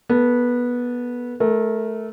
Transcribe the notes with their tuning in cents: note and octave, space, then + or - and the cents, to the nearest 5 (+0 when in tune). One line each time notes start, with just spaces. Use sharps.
B3 -15 A4 +10
A3 -20 A#4 +0